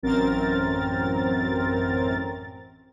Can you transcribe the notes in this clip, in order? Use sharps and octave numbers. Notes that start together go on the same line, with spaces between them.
A1 F#2 C4 A#4 A6